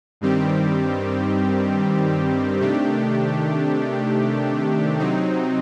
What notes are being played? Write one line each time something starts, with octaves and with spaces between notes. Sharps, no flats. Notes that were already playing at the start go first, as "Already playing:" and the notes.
G2 D#3 G3 C4 G4
C3 D#3 A3 D4 G4
C3 F#3 C4 D#4